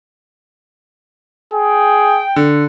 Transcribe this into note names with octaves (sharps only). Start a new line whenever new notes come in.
G#4 G5
D3